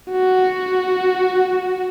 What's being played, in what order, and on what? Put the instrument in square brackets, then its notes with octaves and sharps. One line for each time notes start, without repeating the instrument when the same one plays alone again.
[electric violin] F#4